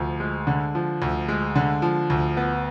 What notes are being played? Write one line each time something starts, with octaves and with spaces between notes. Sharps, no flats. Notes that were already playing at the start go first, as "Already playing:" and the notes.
Already playing: D2 F3
G#3
D3
F3
D2
G#3
D3
F3
D2
B3